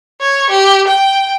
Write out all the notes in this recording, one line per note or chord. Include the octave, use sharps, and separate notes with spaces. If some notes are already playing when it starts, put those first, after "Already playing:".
C#5
G4
G5